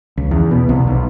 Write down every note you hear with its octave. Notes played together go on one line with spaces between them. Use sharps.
C#2
E2
B2
C2
B1